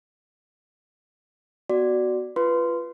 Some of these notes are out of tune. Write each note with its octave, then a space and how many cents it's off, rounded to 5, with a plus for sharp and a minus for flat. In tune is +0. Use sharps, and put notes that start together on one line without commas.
B3 +0 F#4 +10 D5 +0
F4 -25 B4 +0 C6 -15